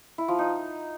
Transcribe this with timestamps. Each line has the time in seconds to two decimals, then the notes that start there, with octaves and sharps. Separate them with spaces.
0.18 E4
0.28 F3
0.39 D#4